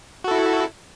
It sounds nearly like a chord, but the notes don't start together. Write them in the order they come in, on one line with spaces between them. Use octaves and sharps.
F#4 A4 E4